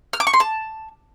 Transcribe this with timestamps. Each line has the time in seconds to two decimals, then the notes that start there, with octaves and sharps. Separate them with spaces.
0.13 F6
0.20 D6
0.27 C#6
0.33 C6
0.40 A5